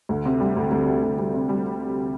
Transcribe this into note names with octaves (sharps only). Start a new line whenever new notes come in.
D2
C3
G3
D2
D2
C3
D2
G3
C3
G3